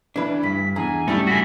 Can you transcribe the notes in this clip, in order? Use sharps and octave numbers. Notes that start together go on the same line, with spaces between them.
D2 E3 D4 B4
G2 B6
E2 D3 G#4 G#5 A#5
G#2 C#3 G3 A3 E4 G4
F#4 G#4 B6